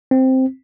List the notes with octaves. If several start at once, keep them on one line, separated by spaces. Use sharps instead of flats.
C4